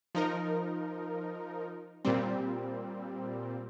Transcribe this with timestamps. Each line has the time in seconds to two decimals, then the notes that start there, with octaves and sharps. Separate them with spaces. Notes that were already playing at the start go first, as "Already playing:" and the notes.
0.15 F3 D#4 A#4
2.05 A#2 G3 C4